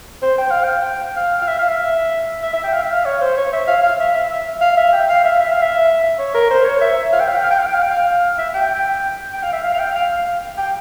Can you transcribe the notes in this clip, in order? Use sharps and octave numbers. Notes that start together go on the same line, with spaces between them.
C5
G5
F5
G5
F5
F5
E5
F5
E5
E5
E5
G5
F5
E5
F5
C#5
C5
C#5
E5
F5
F5
E5
E5
E5
F5
E5
G5
F5
E5
E5
F5
E5
C#5
A#4
C5
C#5
E5
F5
G5
F5
G5
F5
G5
F5
G5
F5
G5
F5
E5
G5
G5
F5
E5
F5
F5
G5
F5
F5
G5